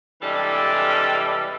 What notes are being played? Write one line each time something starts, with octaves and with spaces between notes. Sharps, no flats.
C3 E3 G3 G#3 D4 A4